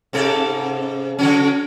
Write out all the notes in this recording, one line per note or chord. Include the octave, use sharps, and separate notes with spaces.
G#2 C3 A4
C#3 F#3 C#4